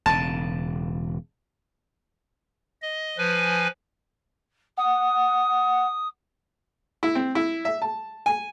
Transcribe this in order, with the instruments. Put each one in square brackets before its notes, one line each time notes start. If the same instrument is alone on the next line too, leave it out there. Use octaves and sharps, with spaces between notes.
[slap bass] E1 C#3 [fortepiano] A5
[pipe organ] D#5
F3 B4 G#5
[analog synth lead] F#5 [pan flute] D#6
[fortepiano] E4
C4
E4
E5
A5
G#5